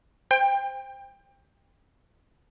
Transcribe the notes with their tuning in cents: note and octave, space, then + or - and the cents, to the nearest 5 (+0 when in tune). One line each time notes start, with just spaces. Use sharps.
C5 +0 G5 +25